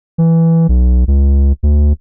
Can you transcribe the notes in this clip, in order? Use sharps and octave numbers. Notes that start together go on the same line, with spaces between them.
E3
B1
C#2
D2